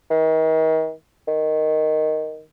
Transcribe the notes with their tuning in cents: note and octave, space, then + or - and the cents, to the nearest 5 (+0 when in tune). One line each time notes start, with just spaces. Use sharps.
D#3 +40
D#3 +0